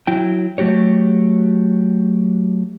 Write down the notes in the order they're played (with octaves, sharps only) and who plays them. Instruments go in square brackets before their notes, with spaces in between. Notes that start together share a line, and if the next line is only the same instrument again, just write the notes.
[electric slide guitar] F#3 E4 G5
F#3 A3 F#4 G4 C#5